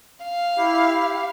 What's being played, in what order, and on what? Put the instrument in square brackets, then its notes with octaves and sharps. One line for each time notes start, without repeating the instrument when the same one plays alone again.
[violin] F5
[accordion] E4 G4